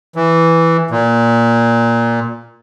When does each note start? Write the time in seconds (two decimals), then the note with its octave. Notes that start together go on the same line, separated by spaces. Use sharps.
0.16 E3
0.91 A#2